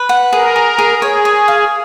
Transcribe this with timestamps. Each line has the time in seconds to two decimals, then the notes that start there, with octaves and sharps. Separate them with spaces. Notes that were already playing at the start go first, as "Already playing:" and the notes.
Already playing: B4
0.09 F#5
0.32 G#4 A#4
0.56 G#4
0.78 G#4
1.02 G#4 C#5
1.25 C#5
1.48 F5